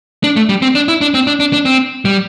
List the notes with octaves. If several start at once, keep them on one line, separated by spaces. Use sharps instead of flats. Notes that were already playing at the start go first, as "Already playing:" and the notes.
D4
A3
G3
C4
D4
E4
D4
C4
D4
D4
D4
C4
G3